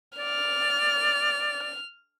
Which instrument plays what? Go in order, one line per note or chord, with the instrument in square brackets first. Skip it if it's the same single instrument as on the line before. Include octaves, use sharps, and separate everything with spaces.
[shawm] D5 [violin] F6